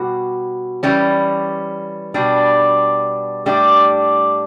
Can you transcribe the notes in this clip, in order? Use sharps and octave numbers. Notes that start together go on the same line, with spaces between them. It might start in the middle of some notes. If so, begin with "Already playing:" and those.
Already playing: B2 G3 F#4
E3 G3 C#4
B2 G3 D4
A2 G3 D4 G4